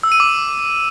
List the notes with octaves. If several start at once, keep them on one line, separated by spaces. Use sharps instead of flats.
E6
D#7
D6